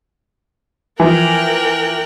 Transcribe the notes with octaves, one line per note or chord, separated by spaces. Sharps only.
E3 F3 A#4 G5 F#6